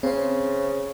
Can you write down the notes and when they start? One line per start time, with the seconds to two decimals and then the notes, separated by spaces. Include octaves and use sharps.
0.03 C#3 C4 C5